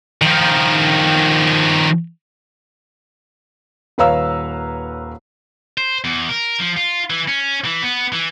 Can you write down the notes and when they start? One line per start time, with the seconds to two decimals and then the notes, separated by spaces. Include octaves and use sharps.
0.22 D#3 F3
3.98 D#1 B4 C#5 F5 A#5 E6
5.78 C5
6.04 E2
6.29 A#4
6.59 F3
6.77 F4
7.10 E3
7.28 C#4
7.65 E3
7.82 B3
8.13 E3